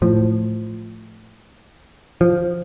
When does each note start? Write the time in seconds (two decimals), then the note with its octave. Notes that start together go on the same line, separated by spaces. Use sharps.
0.02 A2 F3
2.21 F3